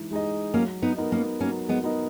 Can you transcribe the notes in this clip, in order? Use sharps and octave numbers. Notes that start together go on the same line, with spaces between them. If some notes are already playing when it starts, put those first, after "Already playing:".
Already playing: E3 G#3 D#4 G#4
G#3 D#4 G#4 D#5
F#3 A#3 C#4
B3 D#4
B3 D#4 A#4 D#5
A#3 C#4
F#3 A#3 C#4
G#3 B3
B3 D#4 A#4 D#5